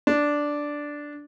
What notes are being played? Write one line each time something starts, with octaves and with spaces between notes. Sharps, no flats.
D4